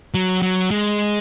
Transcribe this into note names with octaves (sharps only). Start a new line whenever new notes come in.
F#3
F#3
G#3